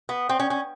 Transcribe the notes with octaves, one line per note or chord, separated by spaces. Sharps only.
B3
C4
C#4
C#4